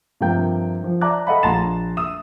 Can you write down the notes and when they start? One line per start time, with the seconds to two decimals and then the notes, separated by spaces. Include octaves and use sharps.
0.21 G2 C3 F3 A#3 G5 G6
0.84 F3
1.01 D5 E5 A5 A#5 D6 F#6
1.27 A4 D#5 F5 F#5 A5 B5
1.43 A#1 A5 A#5 C6 A6 E7
1.97 E5 D#6 E6 E7